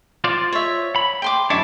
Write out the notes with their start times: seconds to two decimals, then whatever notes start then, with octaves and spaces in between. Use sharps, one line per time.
0.24 F4 C5 D5
0.52 C#5 E5
0.96 B5
1.22 G5 C6 D6
1.50 F#2 D4 E4 C#5 D6